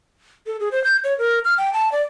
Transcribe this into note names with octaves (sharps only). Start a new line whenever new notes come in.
A4
G#4
C5
G6
C#5
A#4
F6
G5
A5
D5